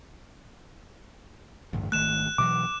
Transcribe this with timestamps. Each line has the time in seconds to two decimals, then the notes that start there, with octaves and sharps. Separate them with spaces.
1.73 A1 D2 G2
1.92 G#1 D#3 A3 F#6 E7
2.38 B2 E3 F#3 D6